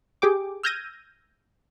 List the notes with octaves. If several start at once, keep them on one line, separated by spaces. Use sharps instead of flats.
G4 G#4 G5 D6
E6 F6 G6 G#6 A#6 D#7